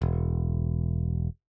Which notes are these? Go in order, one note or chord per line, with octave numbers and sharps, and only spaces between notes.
E1